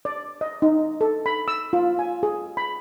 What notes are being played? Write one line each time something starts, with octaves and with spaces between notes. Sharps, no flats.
D5
D#5
D#4
A4
B5
E6
F4
G#5
G#4
B5